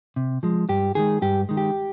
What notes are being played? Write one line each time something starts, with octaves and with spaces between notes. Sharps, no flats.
C3
F3 G#3
G2 G4
D#3 G#3 G#4
G2 G4
D#3 G#3
G4